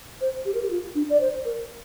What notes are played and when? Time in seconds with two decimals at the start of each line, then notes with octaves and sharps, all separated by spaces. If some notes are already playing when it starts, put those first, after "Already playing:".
0.21 C5
0.46 G4
0.54 A#4
0.62 G4
0.70 F4
0.95 D4
1.10 D5
1.20 C5
1.45 A#4